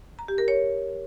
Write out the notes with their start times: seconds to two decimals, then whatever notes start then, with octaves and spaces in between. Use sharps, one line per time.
0.19 A#5
0.28 G4
0.38 A#4
0.48 C#5